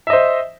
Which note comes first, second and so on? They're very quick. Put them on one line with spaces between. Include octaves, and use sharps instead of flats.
E5 D#5 C5